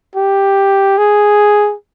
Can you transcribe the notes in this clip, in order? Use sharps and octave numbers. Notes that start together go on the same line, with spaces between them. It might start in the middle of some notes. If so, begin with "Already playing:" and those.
G4
G#4